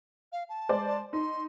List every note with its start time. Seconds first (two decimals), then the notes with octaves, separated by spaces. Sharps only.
0.32 F5
0.49 A5
0.69 G#3 C5 D5
1.13 D#4 C6